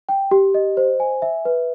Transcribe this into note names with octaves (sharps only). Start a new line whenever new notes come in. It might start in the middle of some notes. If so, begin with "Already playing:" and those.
G5
G4
D#5
C5
G#5
E5
B4